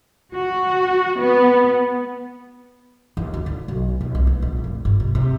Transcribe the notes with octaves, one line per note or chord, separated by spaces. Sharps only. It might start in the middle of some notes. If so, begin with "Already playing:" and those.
F#4
B3
D#2
D2
D3
B1
D#2
C2
B3
A#1
F1
G1
C3
C3